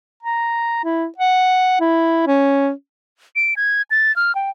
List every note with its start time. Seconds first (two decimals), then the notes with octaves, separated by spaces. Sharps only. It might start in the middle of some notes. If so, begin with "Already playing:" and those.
0.23 A#5
0.85 E4
1.18 F#5
1.80 E4
2.27 C#4
3.36 D7
3.57 G#6
3.91 A6
4.16 F6
4.35 G5